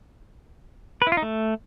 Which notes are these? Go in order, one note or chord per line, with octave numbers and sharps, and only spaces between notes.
B4
E4
F4
D#4
A3